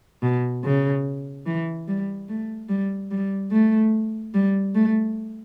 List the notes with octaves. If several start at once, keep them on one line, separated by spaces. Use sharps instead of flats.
B2
C#3
E3
G3
A3
G3
G3
A3
G3
A3